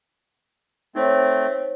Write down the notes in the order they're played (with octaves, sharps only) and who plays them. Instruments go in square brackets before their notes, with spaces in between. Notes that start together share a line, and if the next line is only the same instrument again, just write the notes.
[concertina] A3 C4 [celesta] D#4 C5 C#5